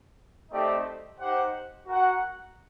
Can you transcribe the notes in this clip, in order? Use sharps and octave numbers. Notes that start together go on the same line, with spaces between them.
A3 C4 D#4 G4 D5
D#4 G4 C5 F#5
F#4 A#4 F#5